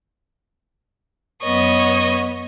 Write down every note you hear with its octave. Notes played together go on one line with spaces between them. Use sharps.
F#2 B3 C#5 D#5 C#6